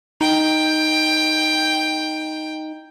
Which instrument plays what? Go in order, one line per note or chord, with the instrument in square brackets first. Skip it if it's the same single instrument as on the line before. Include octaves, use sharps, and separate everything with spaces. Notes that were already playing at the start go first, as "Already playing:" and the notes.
[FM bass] D#4 [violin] G5